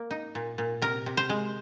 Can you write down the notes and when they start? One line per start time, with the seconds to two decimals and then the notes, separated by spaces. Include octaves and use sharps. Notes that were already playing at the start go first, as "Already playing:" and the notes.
Already playing: A#3
0.11 D#4
0.35 A#2
0.58 A#2
0.82 C3 A#4
1.06 C3
1.17 C5
1.29 G#3